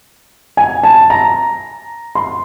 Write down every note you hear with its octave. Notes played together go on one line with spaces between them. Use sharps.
G#5
A5
A#5
C6